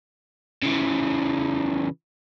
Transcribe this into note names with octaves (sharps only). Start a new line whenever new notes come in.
C#3 E3